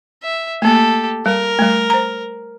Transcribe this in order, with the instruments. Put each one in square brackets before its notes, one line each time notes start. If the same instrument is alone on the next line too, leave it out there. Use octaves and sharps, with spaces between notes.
[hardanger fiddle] E5
[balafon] A3 A#3 [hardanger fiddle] G4 A4
[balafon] G3 [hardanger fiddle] A#4
[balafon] G3 A3
C5 A#5